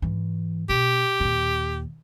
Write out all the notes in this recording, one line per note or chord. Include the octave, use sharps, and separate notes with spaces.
G#2 E3
B2 G4
D#2 A#2